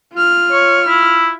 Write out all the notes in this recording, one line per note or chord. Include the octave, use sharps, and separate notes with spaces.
F4 F6
C#5
E4